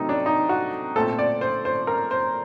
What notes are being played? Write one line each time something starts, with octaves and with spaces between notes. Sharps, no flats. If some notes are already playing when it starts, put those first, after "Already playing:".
Already playing: C3 F#3 A3 C4 D#4
D4
D#4
F#4
A#2 A3 C4 A4
D5
C5
C5
A#4
C5